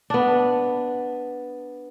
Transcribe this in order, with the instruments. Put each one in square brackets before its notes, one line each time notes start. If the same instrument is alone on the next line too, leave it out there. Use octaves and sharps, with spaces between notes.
[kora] B3 D4